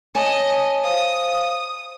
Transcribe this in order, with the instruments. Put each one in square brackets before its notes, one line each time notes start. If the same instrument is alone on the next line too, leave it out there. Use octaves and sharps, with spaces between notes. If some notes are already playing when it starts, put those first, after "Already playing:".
[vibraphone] C#5 [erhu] D#5 [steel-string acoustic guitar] G#5 A5
[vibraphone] C5 F5 [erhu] D#6